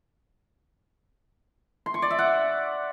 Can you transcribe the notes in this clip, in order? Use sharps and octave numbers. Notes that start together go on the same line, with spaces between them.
C6
C#6
D5
E5
F#5